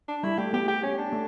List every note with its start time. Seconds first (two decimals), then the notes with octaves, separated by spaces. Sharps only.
0.08 D4
0.23 G3 E4
0.38 A3 G4
0.53 B3 G4
0.68 G4
0.83 C#4
0.98 D4
1.13 A3